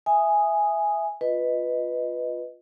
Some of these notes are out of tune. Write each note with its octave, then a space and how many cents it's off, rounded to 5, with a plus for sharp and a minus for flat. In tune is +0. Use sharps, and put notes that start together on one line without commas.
E5 +0 G#5 +0 D#6 +0
F4 +5 B4 +0 D#5 +0